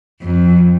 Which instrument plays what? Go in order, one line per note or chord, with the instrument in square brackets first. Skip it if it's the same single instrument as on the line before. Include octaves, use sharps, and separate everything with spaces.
[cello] F2